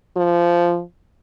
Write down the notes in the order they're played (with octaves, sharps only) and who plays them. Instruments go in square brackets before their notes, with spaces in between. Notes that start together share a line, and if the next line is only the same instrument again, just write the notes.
[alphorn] F3